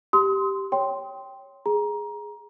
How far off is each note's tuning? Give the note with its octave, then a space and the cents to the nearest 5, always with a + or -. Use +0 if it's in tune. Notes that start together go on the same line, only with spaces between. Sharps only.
G4 -5 C6 -10 D#6 +35
C#5 +0 G5 +0 C6 +0
G#4 +0 A#5 +20